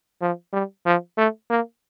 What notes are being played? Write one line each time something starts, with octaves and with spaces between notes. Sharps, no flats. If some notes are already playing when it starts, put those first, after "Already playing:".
F3
G3
F3
A3
A#3